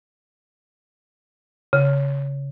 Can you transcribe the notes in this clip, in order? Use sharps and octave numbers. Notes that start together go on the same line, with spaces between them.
C#3